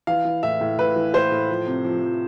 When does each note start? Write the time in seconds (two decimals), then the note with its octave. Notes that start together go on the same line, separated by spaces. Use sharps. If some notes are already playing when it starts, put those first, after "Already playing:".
0.07 E3 F5
0.25 E3
0.43 A2 E5
0.61 A2
0.78 A2 B4
0.96 E3
1.14 A2 C5
1.32 A2
1.49 F3
1.67 C3
1.85 F3
2.03 F3